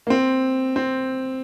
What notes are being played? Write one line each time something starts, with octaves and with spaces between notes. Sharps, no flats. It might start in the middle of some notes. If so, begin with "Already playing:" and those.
A#3
C4
C4